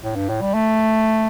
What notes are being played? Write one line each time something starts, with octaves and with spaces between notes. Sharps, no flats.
A2
G2
A2
G3
A3